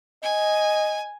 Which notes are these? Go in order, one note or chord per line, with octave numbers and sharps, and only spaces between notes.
D#5 G#5